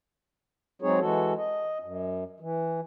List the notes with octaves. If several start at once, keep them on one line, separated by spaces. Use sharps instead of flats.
F#3 G#3 C4 D#4 G#4 C#5
E3 G#3 F#4 A4
D#5
F#2
E3